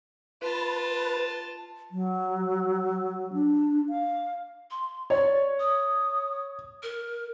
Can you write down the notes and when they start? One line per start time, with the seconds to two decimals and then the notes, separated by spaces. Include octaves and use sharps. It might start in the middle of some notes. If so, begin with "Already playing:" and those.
0.42 F4 B4 A5
1.91 F#3
3.33 D4
3.89 F5
4.71 C6
5.10 C#5 D5
5.60 D#6
6.83 A#4